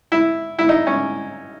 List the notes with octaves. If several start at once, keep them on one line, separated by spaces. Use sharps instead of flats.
E4
E4
D#4
C#4